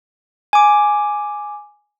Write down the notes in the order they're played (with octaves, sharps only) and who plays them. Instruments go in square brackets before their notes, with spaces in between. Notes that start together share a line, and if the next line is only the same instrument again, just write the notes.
[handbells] G#5 D6